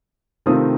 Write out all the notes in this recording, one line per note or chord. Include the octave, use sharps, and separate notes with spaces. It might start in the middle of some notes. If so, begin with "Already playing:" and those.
C3 D#3 A3 C4 F4 D#6